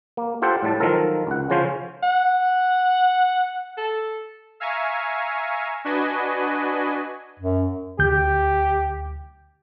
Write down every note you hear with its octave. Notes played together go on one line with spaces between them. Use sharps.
A#3
F4 G4 A4 C5 F#5 G5
A2 G3 A5
D#3 F3 F#3 F4 A4 A#4
C#2 F#5
C#3 F3 C#4 F4 C5
F#5
A4
E5 F5 G#5 A#5 C#6
D4 F#4 B4 D#5 G#5
F#2
D2 G4 G6